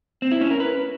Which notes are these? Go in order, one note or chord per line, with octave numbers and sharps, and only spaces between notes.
C4
E4
C#4
A#4
B4